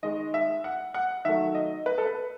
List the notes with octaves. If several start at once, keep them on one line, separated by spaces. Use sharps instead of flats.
D#3 G#3 D#5
E5
F#5
F#5
D#3 F#3 A3 E5
D#5
B4
A4
B4